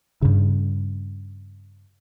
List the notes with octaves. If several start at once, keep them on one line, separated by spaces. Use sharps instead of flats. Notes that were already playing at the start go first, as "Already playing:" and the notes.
G2 C#3